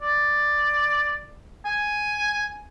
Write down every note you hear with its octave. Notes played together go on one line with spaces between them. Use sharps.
D5
G#5